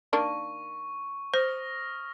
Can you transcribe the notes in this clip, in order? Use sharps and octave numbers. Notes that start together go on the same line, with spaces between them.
D#3 A#3 D4 C#6
C5 D#6 F6 A#6